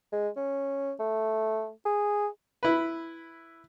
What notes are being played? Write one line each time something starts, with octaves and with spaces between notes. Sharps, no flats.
G#3
C#4
A3
G#4
E4 B4